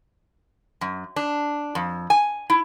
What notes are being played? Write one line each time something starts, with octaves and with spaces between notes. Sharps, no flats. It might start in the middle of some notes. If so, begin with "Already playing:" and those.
F#2
D4
F2
G#5
E4